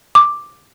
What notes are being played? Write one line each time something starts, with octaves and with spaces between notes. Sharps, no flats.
D6